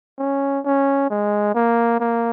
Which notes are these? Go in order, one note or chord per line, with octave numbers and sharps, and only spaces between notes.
C#4
C#4
G#3
A#3
A#3